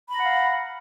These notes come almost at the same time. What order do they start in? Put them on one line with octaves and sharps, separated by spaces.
B5 A#5 F#5 F5